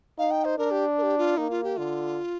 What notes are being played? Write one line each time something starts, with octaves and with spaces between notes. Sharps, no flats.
D#4 F5
G5
C5
D4 A#4
G4
A#4
G4
F4
A#3 D#4
F4
G4
D3 F4